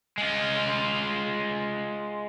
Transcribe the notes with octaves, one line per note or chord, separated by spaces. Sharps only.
G#3 F4